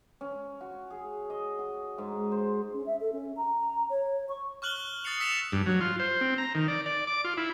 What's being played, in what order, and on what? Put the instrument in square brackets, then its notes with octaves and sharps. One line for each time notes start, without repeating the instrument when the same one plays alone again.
[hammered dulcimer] C#4
F#4
G#4
D#5
F#4
G#2
C5
[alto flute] C#4
E5
A4
C#4
A#5
C#5
C#6
[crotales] C#6 F6 F#6 F#7 G7
D#6 A6 C7 C#7 F7
E6 B6 C#7 E7 F7
[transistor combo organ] G2
F#3
F4
C5
C4
A#5
D#3
D5
D5
D6
F4
E4